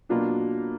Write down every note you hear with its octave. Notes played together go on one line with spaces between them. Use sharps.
B2 F#3 A#3 D4 F4